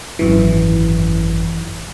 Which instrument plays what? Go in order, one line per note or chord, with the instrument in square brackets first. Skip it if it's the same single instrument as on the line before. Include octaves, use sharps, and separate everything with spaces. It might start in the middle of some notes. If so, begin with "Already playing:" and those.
[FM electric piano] G#1 F#2 E3